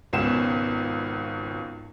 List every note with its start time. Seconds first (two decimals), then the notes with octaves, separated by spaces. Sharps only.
0.13 G#1 C#2 B2 B3 C#4 E7